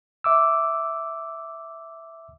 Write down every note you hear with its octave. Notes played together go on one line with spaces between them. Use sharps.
E5 D6 E6